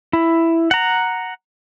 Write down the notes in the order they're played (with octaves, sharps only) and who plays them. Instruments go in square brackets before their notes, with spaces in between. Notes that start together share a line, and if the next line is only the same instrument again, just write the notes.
[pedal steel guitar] E4
F#5 A#5